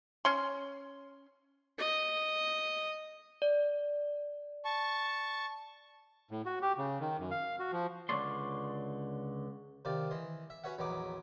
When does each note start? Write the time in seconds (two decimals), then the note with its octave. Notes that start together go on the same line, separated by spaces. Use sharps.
0.25 C#4 C6
1.79 D#5
3.42 D5
4.65 A5 C#6
6.31 A2
6.46 F#4
6.62 G4
6.78 C#3
7.00 D#3
7.19 F#2
7.31 F5
7.59 F#4
7.72 F3
8.09 C#2 D3 C#5 D5 C6
9.85 C3 D#3 F4 D5
10.11 E3 D#5 C6
10.50 E5
10.64 C#4 F#4 B4 C#5 E5 F#5
10.78 A#1 E2 F#3 B3 D#4 D6